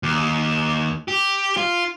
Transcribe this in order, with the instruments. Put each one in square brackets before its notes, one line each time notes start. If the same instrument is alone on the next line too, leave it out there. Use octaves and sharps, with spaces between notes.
[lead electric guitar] D#2
G4
F4